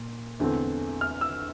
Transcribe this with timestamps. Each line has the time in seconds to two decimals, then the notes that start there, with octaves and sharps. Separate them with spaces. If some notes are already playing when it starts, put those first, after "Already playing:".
Already playing: A#2
0.40 E2 D3 A3 C4
1.01 F6
1.21 E6